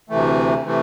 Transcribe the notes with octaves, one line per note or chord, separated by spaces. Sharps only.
D2 C3 E3 A3
C3 E3 A3